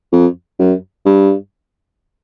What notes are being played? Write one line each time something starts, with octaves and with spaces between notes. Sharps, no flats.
F2
F#2
G2